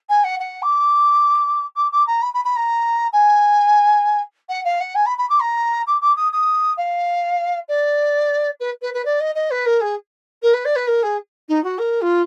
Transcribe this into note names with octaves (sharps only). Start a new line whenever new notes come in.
G#5
F#5
F#5
D6
D6
D6
A#5
B5
B5
B5
A#5
G#5
F#5
F5
F#5
G#5
B5
B5
D6
A#5
D6
D6
D#6
D#6
F5
D5
B4
B4
B4
D5
D#5
D#5
B4
A#4
G#4
A#4
B4
D5
B4
A#4
G#4
D#4
F#4
A#4
F4